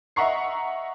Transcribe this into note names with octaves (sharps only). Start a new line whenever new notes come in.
D#5 E5 F#5 A#5 C#6 C7